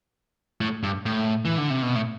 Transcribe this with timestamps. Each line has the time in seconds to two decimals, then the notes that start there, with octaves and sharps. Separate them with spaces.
0.61 A2
0.83 G2
1.06 A2
1.45 E3
1.58 D3
1.70 C3
1.82 B2
1.95 A2